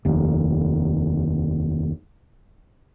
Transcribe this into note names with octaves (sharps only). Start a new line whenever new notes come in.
F1 D#2